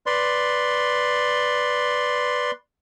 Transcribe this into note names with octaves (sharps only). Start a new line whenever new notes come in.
B4 D5 C6